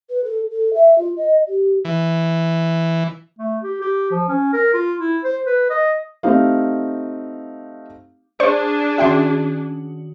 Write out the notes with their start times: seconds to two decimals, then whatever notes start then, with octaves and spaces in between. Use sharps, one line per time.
0.09 B4
0.24 A4
0.51 A4
0.74 E5
0.98 F4
1.17 D#5
1.48 G4
1.85 E3
3.39 A3
3.63 G4
3.82 G4
4.11 F3
4.29 C#4
4.53 A#4
4.74 F4
4.98 E4
5.24 C5
5.47 B4
5.70 D#5
6.23 A3 C4 D#4 G4 F5
8.40 D4 G#4 C5 D5 C#6
8.98 D#3 C#4 F#4 E5 G5 C6